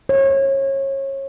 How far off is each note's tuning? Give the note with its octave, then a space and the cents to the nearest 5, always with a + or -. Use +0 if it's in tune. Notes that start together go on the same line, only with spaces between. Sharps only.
C#5 -30